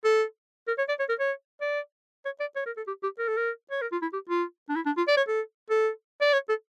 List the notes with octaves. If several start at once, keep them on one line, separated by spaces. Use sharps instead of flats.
A4
A#4
C#5
D5
C#5
A#4
C#5
D5
C#5
D5
C#5
A#4
A4
G4
G4
A#4
A4
A#4
C#5
A#4
F4
E4
G4
F4
D4
E4
D4
F4
D5
C#5
A4
A4
D5
C#5
A4